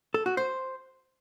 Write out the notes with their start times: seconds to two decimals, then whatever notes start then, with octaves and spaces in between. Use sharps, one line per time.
0.14 A4
0.26 F#4
0.37 C5